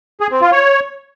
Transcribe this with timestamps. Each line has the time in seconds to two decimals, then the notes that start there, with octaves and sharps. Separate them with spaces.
0.20 G#4
0.31 C4
0.41 F4
0.52 C#5